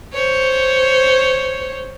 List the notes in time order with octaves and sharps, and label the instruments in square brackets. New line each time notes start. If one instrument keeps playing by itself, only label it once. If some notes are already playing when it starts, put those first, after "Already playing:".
[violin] C5 C#5